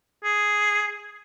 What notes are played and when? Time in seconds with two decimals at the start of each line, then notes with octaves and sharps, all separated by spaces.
0.24 G#4